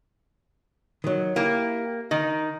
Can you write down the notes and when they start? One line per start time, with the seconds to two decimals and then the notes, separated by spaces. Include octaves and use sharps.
1.04 D#3 F#3
1.36 A#3 E4 G4 A#4
2.11 D#3 D#5